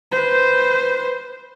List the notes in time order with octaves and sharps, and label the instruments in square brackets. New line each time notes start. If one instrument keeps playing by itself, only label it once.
[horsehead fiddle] B4 C5